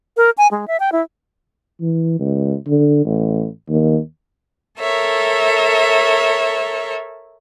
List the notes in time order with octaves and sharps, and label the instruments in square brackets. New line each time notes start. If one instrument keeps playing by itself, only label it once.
[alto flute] A#4
G#5
G#3
E5
G5
E4
[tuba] E3
C#2
D3
A1
D#2
[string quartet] A4 A#4 C#5 E5